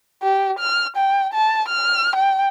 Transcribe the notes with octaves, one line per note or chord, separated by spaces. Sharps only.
G4
F6
G5
A5
F6
G5